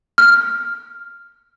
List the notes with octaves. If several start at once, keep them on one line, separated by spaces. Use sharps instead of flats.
F6